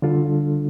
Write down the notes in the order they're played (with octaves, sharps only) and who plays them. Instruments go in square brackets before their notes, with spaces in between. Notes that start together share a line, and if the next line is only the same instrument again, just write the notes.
[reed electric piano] D3 G3 D4 F4 A4